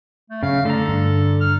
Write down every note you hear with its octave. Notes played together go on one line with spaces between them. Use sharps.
A3
F#2 C#3 F5
D3 A3 A4 A#5
G2
F6